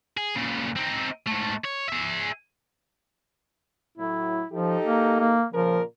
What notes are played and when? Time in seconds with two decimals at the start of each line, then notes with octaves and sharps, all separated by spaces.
0.17 G#4
0.35 A#2 C#3
0.76 C4 D#4
1.27 G#2 A3
1.65 C#5
1.89 G#4 E5
3.98 A2 F#3 E4
4.52 F3 D#4 G4 A4
4.85 A#3
5.19 A#3
5.53 A#2 C#3 F3 A#4